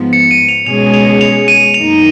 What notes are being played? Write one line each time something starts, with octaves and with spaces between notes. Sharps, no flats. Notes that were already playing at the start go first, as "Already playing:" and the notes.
Already playing: G#2 F3 B3
C#7
D#7
F7
B2 G#3 C#4 G#4 F7
F7
F7
D#7
F#2 D#3 A#3 D#4 F7